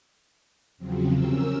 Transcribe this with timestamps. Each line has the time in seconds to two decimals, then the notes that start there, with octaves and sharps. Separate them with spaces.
0.78 E2 C#3 F3 F#3 C4
1.11 C3 C#4 A#4 E6